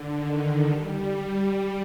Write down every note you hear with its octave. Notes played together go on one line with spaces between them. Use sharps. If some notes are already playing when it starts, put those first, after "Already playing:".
Already playing: D3
D#3
G3
G3